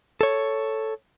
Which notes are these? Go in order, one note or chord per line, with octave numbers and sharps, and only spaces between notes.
A4 C#5